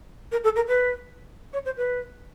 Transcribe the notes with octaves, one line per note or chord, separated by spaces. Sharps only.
A#4
A4
A#4
B4
C#5
C5
B4